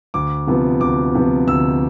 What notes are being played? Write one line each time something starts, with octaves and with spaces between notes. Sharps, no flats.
D2 D6
C3 F3 B3
D2 D6
C3 F3 B3
D2 E6